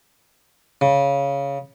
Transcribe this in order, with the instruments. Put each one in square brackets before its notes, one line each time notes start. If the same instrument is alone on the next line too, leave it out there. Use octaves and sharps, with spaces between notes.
[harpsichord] C#3